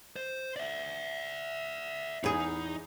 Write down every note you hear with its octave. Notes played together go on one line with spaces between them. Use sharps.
C5
D5 E5
E2 D#4 G#4